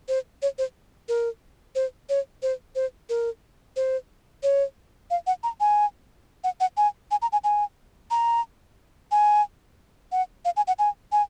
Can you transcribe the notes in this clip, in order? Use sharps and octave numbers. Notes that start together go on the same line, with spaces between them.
C5
C#5
C5
A#4
C5
C#5
C5
C5
A#4
C5
C#5
F5
F#5
A#5
G#5
F#5
F#5
G#5
G#5
A#5
G#5
G#5
A#5
G#5
F#5
F5
G#5
F#5
G#5
G#5